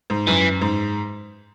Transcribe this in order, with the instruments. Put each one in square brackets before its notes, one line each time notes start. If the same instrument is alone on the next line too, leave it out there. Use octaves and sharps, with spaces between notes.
[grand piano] G#2
[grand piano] F#2 [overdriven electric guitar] E3
[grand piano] G#2